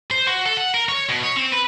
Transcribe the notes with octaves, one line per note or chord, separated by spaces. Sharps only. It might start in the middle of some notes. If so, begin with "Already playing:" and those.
C5
F#4
A4
F#5
A#4
C#5
B2
C#5
C4
B4